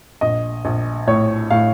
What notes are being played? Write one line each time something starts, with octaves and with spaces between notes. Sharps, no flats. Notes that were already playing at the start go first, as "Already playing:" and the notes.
A#1 D#5
A#1
A2 C#5
A2 F5